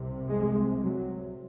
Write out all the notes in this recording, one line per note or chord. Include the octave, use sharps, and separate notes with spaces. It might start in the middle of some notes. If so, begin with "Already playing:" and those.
Already playing: C2 C3
G#3
F#3